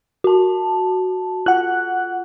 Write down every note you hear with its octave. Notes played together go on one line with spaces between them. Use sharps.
F#4 A5
F4 F#5 F#6